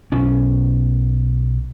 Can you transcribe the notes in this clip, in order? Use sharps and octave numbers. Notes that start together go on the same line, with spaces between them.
B1 C#4